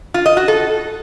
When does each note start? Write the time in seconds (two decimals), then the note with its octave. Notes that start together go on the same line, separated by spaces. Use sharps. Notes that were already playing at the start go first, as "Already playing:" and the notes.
0.14 F4
0.26 D#5
0.37 F#4
0.48 A4